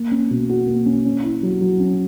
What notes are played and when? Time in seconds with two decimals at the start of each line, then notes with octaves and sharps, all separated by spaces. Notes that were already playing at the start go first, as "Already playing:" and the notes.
Already playing: A#3
0.11 C#4
0.31 B2
0.49 F#4
0.67 A#3
0.86 C#4
1.05 C#4
1.23 E4
1.43 F#3
1.61 F#3
1.80 C#4